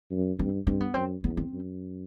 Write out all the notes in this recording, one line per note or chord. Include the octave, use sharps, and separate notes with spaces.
F#2
G2 C4
G2 C4
B3
F#2 C4
E2 B3
C4
F#2